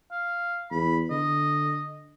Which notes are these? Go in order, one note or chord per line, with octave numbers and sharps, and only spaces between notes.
F5
E2 B5
D3 D#5